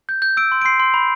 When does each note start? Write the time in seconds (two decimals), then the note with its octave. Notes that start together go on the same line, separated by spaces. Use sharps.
0.09 G6
0.22 G6
0.37 E6 D7
0.52 C6
0.61 D7
0.65 C6 C7
0.80 C6
0.94 B5